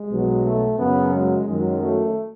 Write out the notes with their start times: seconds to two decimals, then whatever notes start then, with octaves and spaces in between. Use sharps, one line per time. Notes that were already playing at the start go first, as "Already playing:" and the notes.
Already playing: G#3
0.09 B1 B2 F#3
0.44 A3
0.78 F#2 C#3 F#3 B3
1.12 G#3
1.46 F#2 D#3 F#3 G#3
1.81 A3